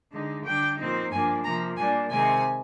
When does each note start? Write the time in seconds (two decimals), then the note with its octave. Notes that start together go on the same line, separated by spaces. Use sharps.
0.11 D3 G#3 D#4
0.44 D3 G3 D4 G5
0.77 A#2 F3 C4 D#4
1.11 G2 F3 A#3 D4 G#5
1.43 C3 F3 A#3 A#5
1.76 A#2 G3 A#3 D4 G#5
2.09 C3 D#3 G#3 C4 G#5